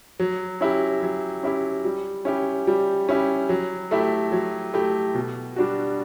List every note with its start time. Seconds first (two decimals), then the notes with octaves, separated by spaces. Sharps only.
0.19 F#3
0.61 C#4 E4 G4
1.02 F#3
1.43 C#4 E4 G4
1.85 G3
2.25 C#4 E4 G4
2.67 G3
3.09 C#4 E4 G4
3.49 F#3
3.91 A3 E4 G4
4.32 F#3
4.74 A3 E4 G4
5.15 B2
5.56 G3 D4 F#4